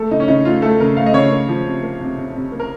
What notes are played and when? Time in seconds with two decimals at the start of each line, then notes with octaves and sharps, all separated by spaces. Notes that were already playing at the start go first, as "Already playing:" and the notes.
Already playing: A3 A4
0.11 C#3 D#4
0.20 C#4
0.28 C#3 D#4
0.45 A3 F4
0.62 A3 A4
0.80 C#3 A#4
0.97 A3 F5
1.06 D#5
1.14 C#3 C#5
1.32 A#3
1.49 F3
1.66 C3
1.83 A#3
2.01 C3
2.18 C3
2.35 C3
2.52 A#3
2.60 A#4